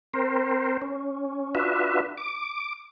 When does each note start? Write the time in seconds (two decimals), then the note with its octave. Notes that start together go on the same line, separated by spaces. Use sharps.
0.14 C4 A#4 C5
0.82 C#4
1.55 D4 F4 F#4 B4 E5
2.18 D6